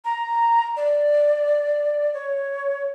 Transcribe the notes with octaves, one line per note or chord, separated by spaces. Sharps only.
A#5
D5
C#5